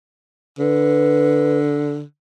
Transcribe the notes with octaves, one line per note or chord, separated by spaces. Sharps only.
D3 B4